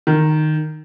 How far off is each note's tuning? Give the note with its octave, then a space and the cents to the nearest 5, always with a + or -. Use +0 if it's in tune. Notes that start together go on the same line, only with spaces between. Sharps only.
D#3 -10